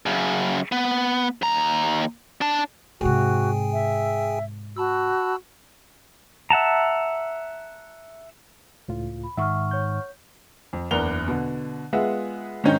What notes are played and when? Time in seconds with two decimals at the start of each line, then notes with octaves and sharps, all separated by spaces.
0.06 F#2 C#3
0.72 B3
1.42 D#2 A#5
2.41 D4 A5
3.01 G#2 C3 F#4 G#4 G5 G#5
3.73 E5
4.77 F#4 A5 B5 E6
6.50 E5 F#5 A5 A#5
8.88 C#2 A2 F4
9.23 B5
9.37 G#2 D#3 E5 F#5 C#6 F6
9.71 C#5 G6
10.73 F2
10.91 F#1 E2 D4 A#4 F7 G7
11.28 B2 D3
11.93 G#3 B3 F4 G#4 E5 F#5
12.64 G#2 D#3 C#4 D#4 G5 G6